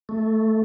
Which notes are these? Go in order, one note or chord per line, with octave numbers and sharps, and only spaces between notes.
A3